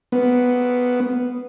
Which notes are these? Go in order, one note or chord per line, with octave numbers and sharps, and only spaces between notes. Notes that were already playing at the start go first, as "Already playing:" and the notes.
B3